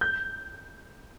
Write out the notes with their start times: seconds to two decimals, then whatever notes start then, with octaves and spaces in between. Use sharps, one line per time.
0.01 G6